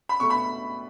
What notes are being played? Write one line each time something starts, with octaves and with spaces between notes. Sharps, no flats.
B5
B2 A3 C#6
B5